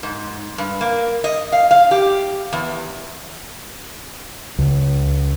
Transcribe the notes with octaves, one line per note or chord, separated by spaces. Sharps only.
G#2
G2
A#3
D#5
F5
F5
G4
E2
C#2